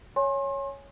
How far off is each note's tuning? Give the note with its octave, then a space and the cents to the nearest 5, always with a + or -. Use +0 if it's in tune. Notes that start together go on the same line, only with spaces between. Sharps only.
C#5 +0 G#5 +0 C6 +40